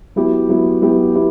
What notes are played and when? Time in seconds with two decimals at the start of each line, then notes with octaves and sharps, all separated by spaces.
0.16 F#3 B3 E4 G4
0.49 F#3 B3 E4 G4
0.82 F#3 B3 E4 G4
1.15 B3 E4 G4